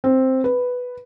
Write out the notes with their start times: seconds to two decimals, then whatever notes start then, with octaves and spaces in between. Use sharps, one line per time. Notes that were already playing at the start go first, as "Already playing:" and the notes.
0.04 C4
0.44 B4